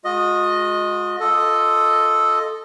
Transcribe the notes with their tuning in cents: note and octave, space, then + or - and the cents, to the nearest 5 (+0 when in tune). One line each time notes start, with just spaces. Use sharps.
G#3 +0 F#4 -45 D#5 +0
F4 +0 A4 +0 D#5 +0